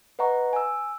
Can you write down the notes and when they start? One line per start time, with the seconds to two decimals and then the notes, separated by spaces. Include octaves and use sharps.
0.19 B4 D#5 F#5 A#5 C#6
0.53 G#5 E6